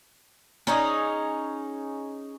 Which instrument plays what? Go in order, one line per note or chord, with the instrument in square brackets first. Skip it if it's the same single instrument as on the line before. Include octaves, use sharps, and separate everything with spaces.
[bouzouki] C#4 D#4 G#4